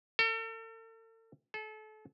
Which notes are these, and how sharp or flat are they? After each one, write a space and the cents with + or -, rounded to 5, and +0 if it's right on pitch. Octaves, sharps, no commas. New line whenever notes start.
A4 +40
A4 -35